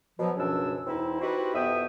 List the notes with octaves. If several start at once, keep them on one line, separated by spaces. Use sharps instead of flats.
B2 F3 F#3
C#2 F#2 B2 C#4 D4 E6
E2 C4 D#4 E4
C4 D#4 E4 F#4 G4 B4
F2 B2 B3 E5 G5 D#6